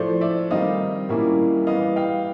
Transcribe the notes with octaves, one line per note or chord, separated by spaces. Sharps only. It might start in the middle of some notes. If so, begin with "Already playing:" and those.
Already playing: A2 F3 A3 C5 D5
D5 E5
D#3 G3 C4 D#4 D#5 F5
A#2 G3 A#3 C#4 E4
E3 G3 B3 D#5 F5
F5 G5